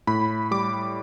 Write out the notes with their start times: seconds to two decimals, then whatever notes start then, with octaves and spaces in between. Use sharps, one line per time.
0.07 A2 B5
0.51 G3 D6